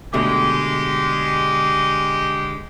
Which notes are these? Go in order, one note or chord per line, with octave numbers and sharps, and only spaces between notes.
B2 D3 G#3 A3 G4